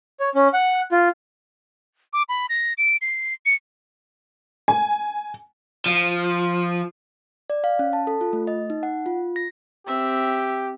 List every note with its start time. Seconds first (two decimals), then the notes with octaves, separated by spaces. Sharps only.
0.20 C#5
0.35 C#4
0.54 F#5
0.92 F4
2.13 D6
2.29 B5
2.49 A#6
2.78 D7
3.02 C7
3.46 C#7
4.68 G#5
5.86 F3
7.50 D5
7.64 F5
7.79 C#4
7.93 A5
8.07 A4
8.21 F4
8.33 A3
8.47 D#5
8.70 D#4
8.83 F#5
9.06 F4
9.36 A#6
9.86 C4 G4 E5